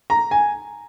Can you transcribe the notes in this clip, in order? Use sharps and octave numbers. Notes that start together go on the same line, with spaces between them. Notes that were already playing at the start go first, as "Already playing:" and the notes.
A#5
G#5